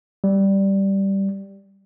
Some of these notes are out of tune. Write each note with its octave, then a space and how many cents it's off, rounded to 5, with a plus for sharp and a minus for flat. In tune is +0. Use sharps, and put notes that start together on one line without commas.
G3 -5